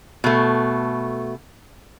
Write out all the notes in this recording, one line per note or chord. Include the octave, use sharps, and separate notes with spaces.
B2 A3